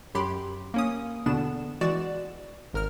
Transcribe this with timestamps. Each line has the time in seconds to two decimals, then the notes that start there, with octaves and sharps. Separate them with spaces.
0.15 F#2 F#3 G4 B5 C6 D7
0.74 A#3 C#4 D#6
1.26 E2 B2 D3 B3 D4 E7
1.81 E3 G#3 F#4 D5 E7
2.73 G#1 A#4 F6